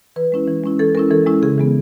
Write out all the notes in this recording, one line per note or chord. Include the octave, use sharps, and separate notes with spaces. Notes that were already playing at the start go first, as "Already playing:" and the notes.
E3 B4
G#3 C#4 E4
E3
G#3 C#4 E4
E3 A4
G#3 C#4 E4 A#4
E3 A4
G#3 C#4 E4
C#3 G#4
E3 G#3 B3